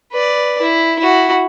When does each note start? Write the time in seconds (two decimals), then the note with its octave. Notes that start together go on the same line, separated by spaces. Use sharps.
0.12 B4 D5
0.61 E4
0.99 E4 F#4